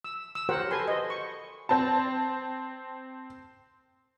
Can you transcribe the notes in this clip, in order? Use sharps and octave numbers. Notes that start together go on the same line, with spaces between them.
E6
E6
F#4 G4 A#4 C5 C#5 F#5
A4 B4 G#5 C6
C5 D#5
C#6
C4 A5